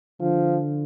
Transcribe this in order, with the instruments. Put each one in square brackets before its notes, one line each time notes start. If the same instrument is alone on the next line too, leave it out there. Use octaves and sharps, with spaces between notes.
[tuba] D3 [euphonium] F3